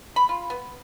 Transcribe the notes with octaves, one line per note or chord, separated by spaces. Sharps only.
B5
F4
B3